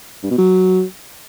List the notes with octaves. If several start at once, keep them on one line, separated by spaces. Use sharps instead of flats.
G2
B2
F#3